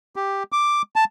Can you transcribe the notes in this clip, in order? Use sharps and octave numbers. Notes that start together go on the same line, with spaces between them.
G4
D6
A5